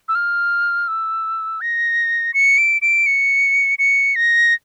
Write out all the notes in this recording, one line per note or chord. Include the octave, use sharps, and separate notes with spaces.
E6
F6
E6
A#6
C#7
D7
D7
C#7
C#7
A#6